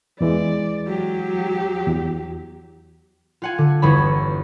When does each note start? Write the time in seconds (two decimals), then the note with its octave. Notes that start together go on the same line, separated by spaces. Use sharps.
0.21 E2 E3 G#3 D5
0.87 F#3 G4
1.87 E2
3.42 F4 F#5 G#5
3.58 D3
3.82 G1 E2 C#5 B5